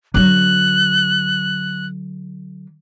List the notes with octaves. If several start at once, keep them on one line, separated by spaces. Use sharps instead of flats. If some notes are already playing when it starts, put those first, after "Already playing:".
D3 F#3 F#6